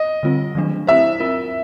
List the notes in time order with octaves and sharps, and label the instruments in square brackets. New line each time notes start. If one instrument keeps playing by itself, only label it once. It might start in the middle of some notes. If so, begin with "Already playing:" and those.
Already playing: [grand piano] D#5
[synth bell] D3 G3 C4 F4
D#3 F#3 A3 D4
[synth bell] C4 E4 G4 C5 [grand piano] E5
[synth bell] C4 F4 A#4